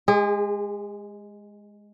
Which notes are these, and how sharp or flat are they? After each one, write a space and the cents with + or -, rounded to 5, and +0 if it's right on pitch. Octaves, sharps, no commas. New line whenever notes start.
G#3 +0 G#4 -40